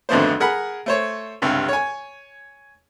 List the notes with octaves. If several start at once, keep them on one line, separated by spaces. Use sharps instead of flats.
G#1 F2 D3 A3 B3 C5
G#4 A#4 F#5 B5
A3 C5 C#5
C#2 G2 C3
C#5 G#5